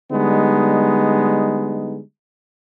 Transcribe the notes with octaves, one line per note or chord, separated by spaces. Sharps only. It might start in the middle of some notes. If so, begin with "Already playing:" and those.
D3 G3 G#3 B3 D#4